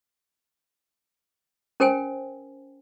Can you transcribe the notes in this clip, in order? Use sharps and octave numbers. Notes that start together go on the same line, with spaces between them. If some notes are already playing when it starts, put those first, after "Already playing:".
C#4 A#4 C5 G5 G#5